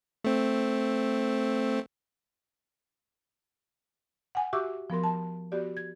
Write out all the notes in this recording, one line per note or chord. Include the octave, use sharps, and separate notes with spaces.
A3 C4
F#5 G#5
F#4 G4 E5 C#6 D6 E6
F3 B3 A#4 C6
A5
B3 F#4 G4 D5
G#6